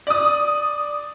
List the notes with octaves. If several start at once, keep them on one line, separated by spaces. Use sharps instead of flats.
D5 D#6